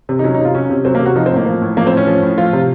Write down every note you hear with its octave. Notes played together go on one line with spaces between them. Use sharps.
C3
D#4
F#3 C#4
D#4
C3
F4
F#3 C#4
C3
F#3 C4
A#3
C3
F#4
F3 D#4
C4
A2 A#3
F3
A2
F3 A#3
C4
A2
C#4
F3
A2
F3 F4
C3